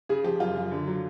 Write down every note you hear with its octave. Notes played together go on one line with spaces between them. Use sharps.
C#3 G#4
F3 G4
F#2 F4
F#2
D3
F#3